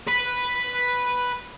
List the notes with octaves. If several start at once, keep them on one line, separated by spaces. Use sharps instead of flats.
B4 B5